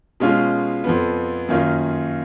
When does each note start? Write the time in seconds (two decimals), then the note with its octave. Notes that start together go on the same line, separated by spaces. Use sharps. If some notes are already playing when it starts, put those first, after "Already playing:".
0.20 B2 G#3 C#4 F4
0.84 F2 F3 B3
1.49 F#2 D#3 A#3 C#4 F4